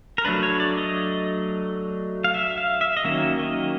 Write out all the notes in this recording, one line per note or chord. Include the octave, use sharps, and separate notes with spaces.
A#4
F#3 A3 D4 B4
C#5
D5
D#5
F5
E5
F5
E5
D#5
D#3 F#3 A#3 C#4 E5
D#5